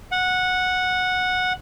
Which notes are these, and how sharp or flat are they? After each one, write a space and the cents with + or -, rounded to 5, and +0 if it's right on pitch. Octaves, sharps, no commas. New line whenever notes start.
F#5 -10